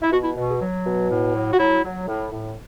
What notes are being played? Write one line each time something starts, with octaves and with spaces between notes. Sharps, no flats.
E4
B2 F#4
E4
B2
G#4
F#3
B2
A2
F#3
F#4
F#3 E4
F#3
A2
A2